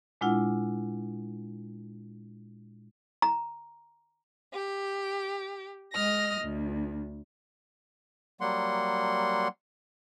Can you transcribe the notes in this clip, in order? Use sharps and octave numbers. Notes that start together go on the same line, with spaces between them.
A#2 G#3 D4 E4 F4 F#5
A#5
G4
G#3 D#5 D#6 F6 A#6
D2
F#3 G3 A#3 F#5 C6